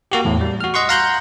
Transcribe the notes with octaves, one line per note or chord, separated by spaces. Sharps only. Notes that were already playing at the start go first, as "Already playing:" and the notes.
A#3 F#4 G4
E2 A2
G3
F#4 F6
D#5 F#5 C6 C#6
F5 F#5 A#5 C6 F#6 G6